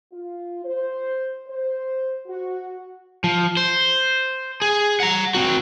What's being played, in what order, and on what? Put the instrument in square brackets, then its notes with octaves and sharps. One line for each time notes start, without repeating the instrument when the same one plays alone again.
[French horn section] F4
C5
C5
F#4
[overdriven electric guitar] F3
C5
G#4
F#5 A#5
C4 F#4